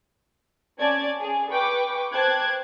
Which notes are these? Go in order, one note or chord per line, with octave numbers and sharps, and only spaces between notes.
C#4 D5 A5 G#6
G#4
B4 G5 C#6 D6
C5 G5 A5 D6 F#6 G#6